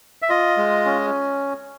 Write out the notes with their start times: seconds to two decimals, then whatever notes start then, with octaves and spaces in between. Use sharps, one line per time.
0.22 E5
0.30 F4 D#5
0.57 G#3
0.86 C#4